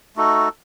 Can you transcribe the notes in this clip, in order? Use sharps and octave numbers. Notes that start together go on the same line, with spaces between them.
A3 D#4 F#4 A4